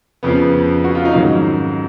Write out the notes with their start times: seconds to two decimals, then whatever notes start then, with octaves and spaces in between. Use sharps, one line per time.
0.23 F2 C#3 F3 B3
0.84 F#4
0.95 F4
1.05 D#4
1.16 G#2 D#3 F#3 C#4